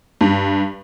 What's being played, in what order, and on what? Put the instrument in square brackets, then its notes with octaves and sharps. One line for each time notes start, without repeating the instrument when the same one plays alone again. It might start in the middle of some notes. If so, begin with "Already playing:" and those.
[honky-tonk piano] G2